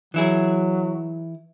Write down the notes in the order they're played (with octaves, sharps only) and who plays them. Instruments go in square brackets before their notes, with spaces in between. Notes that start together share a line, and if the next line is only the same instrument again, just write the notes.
[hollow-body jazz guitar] E3 E4 G#4 [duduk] F#3